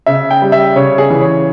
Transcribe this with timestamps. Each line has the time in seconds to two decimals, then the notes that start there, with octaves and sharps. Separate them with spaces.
0.06 C#3 E5
0.31 G5
0.42 G3
0.52 E5
0.76 C#3 C#5
0.98 G#4
1.10 E3
1.21 C#5